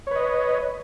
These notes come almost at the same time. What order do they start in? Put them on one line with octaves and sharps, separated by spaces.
C#5 B4 D#5